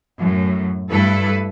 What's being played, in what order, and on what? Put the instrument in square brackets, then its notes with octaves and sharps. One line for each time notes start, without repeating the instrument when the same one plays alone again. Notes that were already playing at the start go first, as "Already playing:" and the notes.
[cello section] F#2 A2
G2 A3 E4 A4 B4